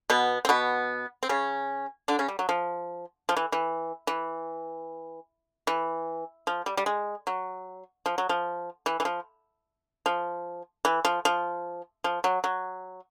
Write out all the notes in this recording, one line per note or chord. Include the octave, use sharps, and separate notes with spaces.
B2 B3
C4
B2 B3
C4
C#3 C#4
D3 D4
C#3 C#4
G3
F#3
F3
F3
E3
E3
E3
E3
F3
G3
G3
G#3
F#3
F3
F#3
F3
E3
E3
F3
F3
E3
F3
F3
F3
F#3
F#3